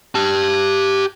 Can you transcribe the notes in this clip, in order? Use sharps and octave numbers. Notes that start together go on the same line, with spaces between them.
G4 A5